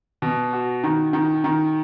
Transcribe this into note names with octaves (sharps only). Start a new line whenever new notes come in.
B2
F#4
D#3
D#3
D#3